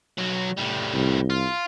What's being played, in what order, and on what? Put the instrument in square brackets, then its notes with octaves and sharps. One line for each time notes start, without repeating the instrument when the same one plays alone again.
[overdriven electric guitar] B1 F#3
A2 G3
[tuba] C2
[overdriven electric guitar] F4